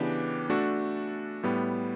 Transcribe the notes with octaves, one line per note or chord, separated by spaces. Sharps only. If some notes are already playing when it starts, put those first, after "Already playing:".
Already playing: C#3 E3 B3 D4 G4
A3 D4 F#4 A4
A2 G3 B3